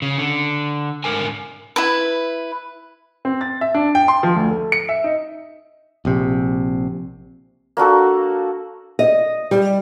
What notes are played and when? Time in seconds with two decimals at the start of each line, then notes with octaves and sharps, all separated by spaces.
0.02 C#3
0.18 D3
1.04 G#2 D3 E3 A#4 G#5
1.76 E4 B4
3.25 C4
3.41 A6
3.61 E5
3.74 D4
3.95 G5
4.08 C6
4.23 F3
4.35 D2
4.51 A4
4.72 C#7
4.89 E5
5.04 D#4
6.05 A#1 C3
7.77 A#3 D4 F#4 A4
8.99 D#5
9.51 G3